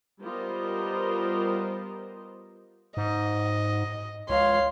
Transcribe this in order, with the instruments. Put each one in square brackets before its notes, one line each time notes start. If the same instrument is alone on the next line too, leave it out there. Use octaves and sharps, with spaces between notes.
[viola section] G3 B3 F4 A#4 C5 D#5
[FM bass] G#2 [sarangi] D#5
[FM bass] C#2 [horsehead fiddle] C#5 F5 [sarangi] C6